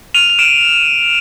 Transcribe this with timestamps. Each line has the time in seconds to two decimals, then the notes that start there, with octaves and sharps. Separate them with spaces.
0.14 F6 D#7 F7
0.30 F7
0.39 F6 D7 E7